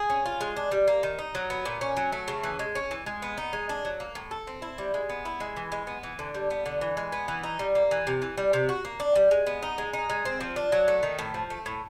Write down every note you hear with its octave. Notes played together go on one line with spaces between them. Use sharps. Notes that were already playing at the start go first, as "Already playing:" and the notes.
Already playing: G#4
C#4
F4
G#3
D4
G3
A#3
D#3
D#4
F#3
B3
A#2
C#4
F#3
A3
C#3
E3
G#3
C#4
E3
G#3
B3
D#4
G#3
D4
F#3
A#3
A2
A4
C4
E4
G3
G#3
B3
E4
G#3
E3
G#3
B3
E3
D3
G3
B3
D3
E3
G#3
B3
E3
D#4
G3
A#3
E3
C3
E3
G3
C3
F#4
A#3
D4
G3
G#3
B3
D#4
G#3
D#4
G#3
C4
F3
D4
F#3
A3
D#3
A2
F3
A3
A2